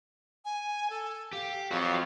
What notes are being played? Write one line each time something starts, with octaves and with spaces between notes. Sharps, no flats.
G#5
A4
G4 F5
F2 F#4 C#5 F5